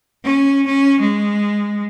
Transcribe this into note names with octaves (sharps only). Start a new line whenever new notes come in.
C#4
C#4
G#3